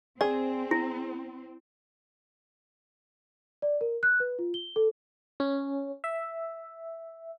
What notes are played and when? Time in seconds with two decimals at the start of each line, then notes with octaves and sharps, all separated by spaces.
0.21 C4 G#4 D5
0.71 E4
3.62 D5
3.81 A#4
4.03 F#6
4.20 B4
4.39 F4
4.54 G7
4.76 A4
5.40 C#4
6.04 E5